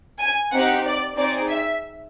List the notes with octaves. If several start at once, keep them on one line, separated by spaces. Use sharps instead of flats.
G#5
C4 D#4 G4 F#5
D5
C4 D#4 G#4 D5
E5